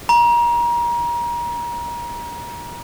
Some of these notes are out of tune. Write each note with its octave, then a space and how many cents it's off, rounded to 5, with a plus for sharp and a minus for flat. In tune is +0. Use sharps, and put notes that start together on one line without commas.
A#5 +30